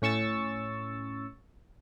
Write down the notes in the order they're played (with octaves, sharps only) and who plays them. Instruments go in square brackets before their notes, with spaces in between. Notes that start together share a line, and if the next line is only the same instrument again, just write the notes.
[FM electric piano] A2 C#4 C#6 E6 A6